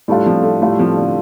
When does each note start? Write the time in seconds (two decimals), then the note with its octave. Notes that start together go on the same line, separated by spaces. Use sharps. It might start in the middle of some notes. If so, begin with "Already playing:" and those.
0.08 A2 G3 A3 D4 F4
0.26 F3
0.43 A3
0.62 A2 G3 A3 F4
0.79 F3
0.97 D3